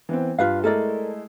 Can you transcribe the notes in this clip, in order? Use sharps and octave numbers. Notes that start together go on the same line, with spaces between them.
E3 B3 C4
G2 F4 B4 F5
G#3 A3 E4 A4 A#4 D5